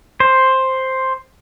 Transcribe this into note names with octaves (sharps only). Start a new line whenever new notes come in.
C5